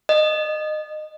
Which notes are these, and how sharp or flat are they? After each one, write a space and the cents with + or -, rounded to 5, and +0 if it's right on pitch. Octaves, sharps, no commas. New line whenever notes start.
D#5 -20